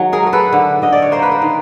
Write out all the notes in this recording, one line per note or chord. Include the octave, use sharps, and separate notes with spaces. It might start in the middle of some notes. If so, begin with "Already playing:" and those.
Already playing: D#3 F#3 G#3
G#4 A#4
A3 A#4
A4 B4
D3
D3 D#5
D5
C#5
A#3 A#4 C5
B4
A#4 C5
D#3